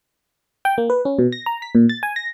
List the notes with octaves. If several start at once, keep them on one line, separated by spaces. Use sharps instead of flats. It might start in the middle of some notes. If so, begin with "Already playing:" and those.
G5
A#3
B4
C#4
B2
A#6
A#5
B6
A#2
A6
G#5
A#6